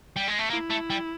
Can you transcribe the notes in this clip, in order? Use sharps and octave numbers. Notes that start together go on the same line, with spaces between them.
G3
G#3
A3
A#3 E4
A3
G3